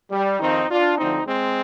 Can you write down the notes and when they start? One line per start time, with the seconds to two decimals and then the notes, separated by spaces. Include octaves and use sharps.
0.11 G3
0.40 F2 D#3 C4 D#4
0.69 D4 F4
0.98 D2 D3 F3 C4 D#4
1.27 G#3 C4